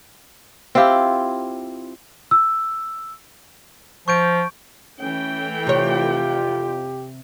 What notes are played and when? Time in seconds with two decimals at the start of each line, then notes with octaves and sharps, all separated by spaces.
0.75 C4 E4 F4 G4
2.31 E6
4.08 F3 C#6 G6 D7
4.99 E3 A3 C#4 G5
5.67 F2 C3 F4 G4 C#5